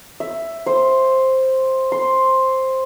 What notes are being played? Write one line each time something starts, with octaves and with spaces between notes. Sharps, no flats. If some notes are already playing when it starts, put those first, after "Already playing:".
E5
C5
C6